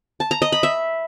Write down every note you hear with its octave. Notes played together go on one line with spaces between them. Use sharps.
A5
A#5
D#5
B5
E5